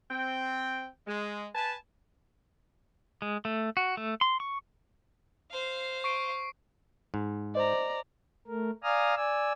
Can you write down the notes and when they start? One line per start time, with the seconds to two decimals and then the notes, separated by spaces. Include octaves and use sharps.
0.10 C4 G5
1.07 G#3
1.54 B4 G#5 A5
3.22 G#3
3.45 A3
3.77 F#4
3.97 A3
4.21 C6
4.40 C#6
5.51 C5 F5
6.04 C#6 C7 D7
7.14 G#2
7.55 C5 D5 D#5 A#5
8.48 A3 A#4
8.83 D5 F5 G#5 A#5 D#6 F6
9.16 D5 G#5 E6